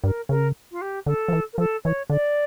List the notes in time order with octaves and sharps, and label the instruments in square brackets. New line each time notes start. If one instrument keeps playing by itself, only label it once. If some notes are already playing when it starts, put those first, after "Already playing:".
[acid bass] G2 [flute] A#4
[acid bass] C#3 [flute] A#4
[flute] F4
G4
[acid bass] D3 [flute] A4
[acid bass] F3
E3
[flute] A#4
[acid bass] F3 [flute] A4
[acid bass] E3 [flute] C#5
[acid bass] D3 [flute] D5